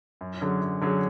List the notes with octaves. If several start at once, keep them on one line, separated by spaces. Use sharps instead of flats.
F#2
D3 F#3 C#4 G#4
F#2
D3 F#3 C#4 G#4